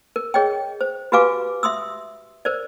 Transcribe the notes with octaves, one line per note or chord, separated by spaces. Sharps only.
A#4
G#4 C#5 D#5 G5
C5
F#4 G4 B4 F5 G#5 D6
E5 C6 D#6 E6
A#4 C5 D5